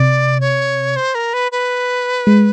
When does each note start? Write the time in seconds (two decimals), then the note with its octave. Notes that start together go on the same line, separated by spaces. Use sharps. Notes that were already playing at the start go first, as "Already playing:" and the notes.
Already playing: C3 D5
0.40 C#5
0.96 C5
1.15 A#4
1.33 B4
1.52 B4
2.27 G#3